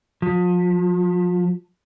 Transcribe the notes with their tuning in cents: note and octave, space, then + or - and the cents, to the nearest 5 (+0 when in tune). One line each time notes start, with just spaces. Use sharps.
F3 +35